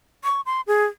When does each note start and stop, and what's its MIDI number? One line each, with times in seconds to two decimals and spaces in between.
0.24 0.41 85
0.46 0.61 84
0.67 0.85 68